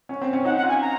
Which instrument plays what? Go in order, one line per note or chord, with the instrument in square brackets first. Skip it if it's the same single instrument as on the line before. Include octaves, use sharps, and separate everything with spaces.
[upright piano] C#4
C4
C#4
[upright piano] D#4 [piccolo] F#5
[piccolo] F#5
[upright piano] F4
[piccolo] G#5
A#5